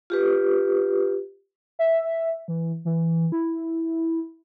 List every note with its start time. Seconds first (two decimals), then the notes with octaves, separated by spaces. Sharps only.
0.10 F4 G4 B4
1.79 E5
2.48 E3
2.85 E3
3.32 E4